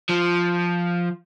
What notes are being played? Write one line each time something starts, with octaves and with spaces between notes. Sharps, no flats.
F3